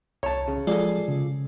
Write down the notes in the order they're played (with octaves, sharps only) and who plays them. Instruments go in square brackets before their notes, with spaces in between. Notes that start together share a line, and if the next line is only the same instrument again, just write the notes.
[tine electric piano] C2 [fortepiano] C#5 A5
[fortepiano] C#3
[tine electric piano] F3 [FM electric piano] G#3 F4 D5 [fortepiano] G#4 A4
[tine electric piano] C#3